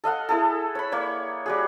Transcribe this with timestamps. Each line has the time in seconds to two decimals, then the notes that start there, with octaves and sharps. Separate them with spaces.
0.04 A4 D#5 F5 F#5
0.29 E4 G#4 A4
0.75 C#5 B5
0.92 A#3 C#5 D5
1.46 G3 F#4 G#4